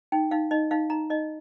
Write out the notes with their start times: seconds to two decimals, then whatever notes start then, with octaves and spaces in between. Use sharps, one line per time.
0.12 D#4 G5
0.31 D#4 F5
0.51 D#4 D#5
0.71 D#4 F5
0.90 D#4 A#5
1.10 D#4 D#5